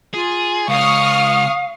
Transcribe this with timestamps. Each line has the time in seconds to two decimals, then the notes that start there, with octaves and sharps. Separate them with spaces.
0.14 F4 G#4
0.68 C#2 F5 C#6 D#6 F6